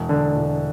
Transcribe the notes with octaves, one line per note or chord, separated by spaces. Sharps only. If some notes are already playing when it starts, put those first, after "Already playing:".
Already playing: E1
D3
E1